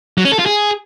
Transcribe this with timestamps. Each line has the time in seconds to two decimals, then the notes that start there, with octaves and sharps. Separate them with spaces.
0.18 F#3
0.25 C#4
0.32 A4
0.39 F4
0.46 G#4